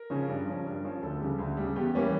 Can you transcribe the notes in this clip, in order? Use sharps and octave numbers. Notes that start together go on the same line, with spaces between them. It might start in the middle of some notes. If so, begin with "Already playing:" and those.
Already playing: A#4
C#3 F3 C#4
G2
F3 C#4
G2
F3 C#4
D2 A4
C#3 G3
D2
C#3 G3
E2 G4
E3 G3 A#3 C#4